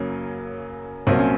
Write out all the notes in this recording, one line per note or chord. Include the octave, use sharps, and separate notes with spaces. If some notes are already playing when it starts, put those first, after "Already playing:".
Already playing: F#2 C#3 F#3 A#3 C#4
C2 A#2 F#3 A#3 C4
C#4